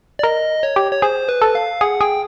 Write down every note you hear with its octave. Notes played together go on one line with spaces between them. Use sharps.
D5
A#4 D#5
C#5
G4
C#5
G#4 C5
B4
A4
F5
G#4 F#5
G#4 G5